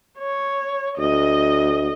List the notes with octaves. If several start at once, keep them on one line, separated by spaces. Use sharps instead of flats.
C#5
D2 D#5